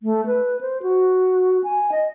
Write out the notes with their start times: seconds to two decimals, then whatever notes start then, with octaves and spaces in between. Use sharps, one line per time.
0.03 A3
0.26 B4
0.61 C5
0.83 F#4
1.64 G#5
1.92 D#5